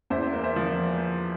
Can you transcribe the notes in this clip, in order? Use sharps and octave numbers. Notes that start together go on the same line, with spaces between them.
E2 C5 E5
A#3
C5 E5
F3